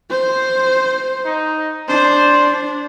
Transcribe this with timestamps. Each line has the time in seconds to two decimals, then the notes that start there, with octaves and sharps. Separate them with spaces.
0.10 C5
1.25 D#4
1.89 D4 C5